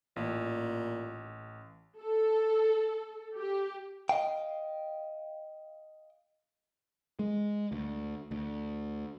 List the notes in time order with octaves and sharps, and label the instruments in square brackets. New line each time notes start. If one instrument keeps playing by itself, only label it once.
[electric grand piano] A1 [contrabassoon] A#2
[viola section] A4
G4
[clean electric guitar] D#5 F5 G5
[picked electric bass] G#3
D2
D2